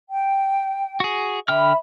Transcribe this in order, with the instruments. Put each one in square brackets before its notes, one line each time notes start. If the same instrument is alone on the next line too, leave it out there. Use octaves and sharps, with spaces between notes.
[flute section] G5
[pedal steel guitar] F#4 G#4
[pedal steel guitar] D3 G5 F6 [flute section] E5 B5